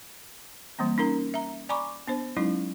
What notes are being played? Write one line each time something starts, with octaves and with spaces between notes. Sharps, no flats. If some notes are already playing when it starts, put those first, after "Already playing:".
E3 G3 A#3 C4
C#4 D#4 A#4 A#5
E5 A#5
D5 G#5 A#5 B5 C#6 D6
B3 D4 C5
F#3 G#3 C#4 D#4 E4